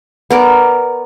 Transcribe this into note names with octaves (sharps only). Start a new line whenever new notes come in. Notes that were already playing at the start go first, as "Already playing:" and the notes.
B3 A#4 D5